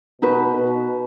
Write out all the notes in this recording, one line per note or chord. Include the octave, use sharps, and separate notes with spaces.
B2 D#4 F#4 B4
B2